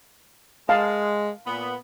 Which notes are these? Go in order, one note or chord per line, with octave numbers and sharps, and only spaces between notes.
G#3 F5 A5
A#2 B3